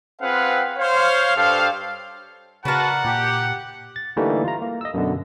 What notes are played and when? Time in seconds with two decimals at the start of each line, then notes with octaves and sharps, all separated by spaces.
0.21 C4 F4 G#4 B4 F5 F#5
0.77 C5 C#5 F5
1.35 G2 G4 A4 C5 F5
2.65 C#3 D4 F#4 A#4 B4 F#5 A5
3.05 A#2 G4
3.96 A6
4.17 D3 E3 G3 A3 A#3 D#4
4.44 F4 A#5
4.62 A#3
4.81 D#5 E6
4.94 F#2 B2 D3